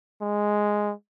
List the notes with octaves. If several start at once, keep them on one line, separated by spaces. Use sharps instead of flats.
G#3